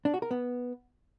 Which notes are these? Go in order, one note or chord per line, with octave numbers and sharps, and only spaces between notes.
D4
F#4
A#4
B3